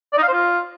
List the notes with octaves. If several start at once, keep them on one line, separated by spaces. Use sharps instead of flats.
D5
D#4
F5
C5
F4